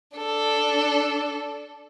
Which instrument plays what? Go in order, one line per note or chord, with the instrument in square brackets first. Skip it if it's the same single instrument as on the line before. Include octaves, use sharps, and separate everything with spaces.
[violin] D4 A4